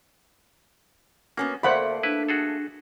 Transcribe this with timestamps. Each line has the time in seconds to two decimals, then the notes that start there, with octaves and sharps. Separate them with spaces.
1.37 A#3 B3 C#4 F#4
1.63 D2 A3 A#3 C5 F#5 B5
2.03 D4 E4 B4
2.29 F#4 G#4 A4